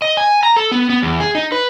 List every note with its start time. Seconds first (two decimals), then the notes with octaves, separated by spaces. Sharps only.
0.02 D#5
0.17 G#5
0.43 A#5
0.56 A4
0.72 B3
0.90 B3
1.02 E2
1.20 G#4
1.35 D#4
1.52 B4